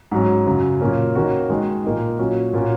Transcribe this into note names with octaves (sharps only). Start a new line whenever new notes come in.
G#2 F#3 C#4
F#2 C#3 F#3
A#2 F#3 A#3 C#4
D#3 A#3 C#4 F#4
D#3 G#3 F#4
A#2 A#3 D#4
A#2 F#3 C#4 F#4
A#2 A#3 C#4 F#4